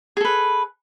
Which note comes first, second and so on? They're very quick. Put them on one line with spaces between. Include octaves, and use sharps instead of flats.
G#4 A4 B4